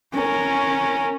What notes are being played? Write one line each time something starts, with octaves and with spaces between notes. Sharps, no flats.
C#4 A#4